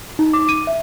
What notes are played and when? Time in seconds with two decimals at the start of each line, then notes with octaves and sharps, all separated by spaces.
0.19 D#4
0.33 D6
0.49 D#7
0.67 E5